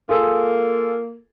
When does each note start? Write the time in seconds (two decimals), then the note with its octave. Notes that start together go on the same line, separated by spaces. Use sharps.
0.09 A#3 F4 G#4 A4